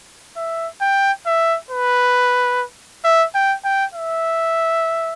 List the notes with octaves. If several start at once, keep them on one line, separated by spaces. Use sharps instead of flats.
E5
G5
E5
B4
E5
G5
G5
E5